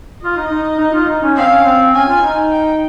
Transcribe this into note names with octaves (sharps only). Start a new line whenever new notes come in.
F4 D#5
D#4
D#4
D#4
F4
D#4
C#4
C4 F5
C#4
C4
C#4 G#5
F4
D#4
G5